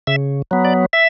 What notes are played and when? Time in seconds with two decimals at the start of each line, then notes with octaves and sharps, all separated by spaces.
0.07 C#3 E5
0.51 F#3 B3
0.65 D5
0.93 E5